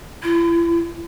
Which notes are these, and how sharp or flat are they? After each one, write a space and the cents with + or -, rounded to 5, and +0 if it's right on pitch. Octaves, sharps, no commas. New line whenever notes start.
E4 +40